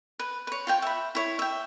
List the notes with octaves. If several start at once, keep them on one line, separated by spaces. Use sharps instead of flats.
B4
B4 C#5
F4 C#5 G5
E5 B5
E4 C#5
E5 G5